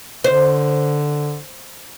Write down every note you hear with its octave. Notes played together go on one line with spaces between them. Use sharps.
D3 C5